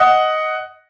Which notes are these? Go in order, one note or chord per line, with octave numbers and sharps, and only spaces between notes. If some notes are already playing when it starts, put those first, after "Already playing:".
Already playing: D#5 F#5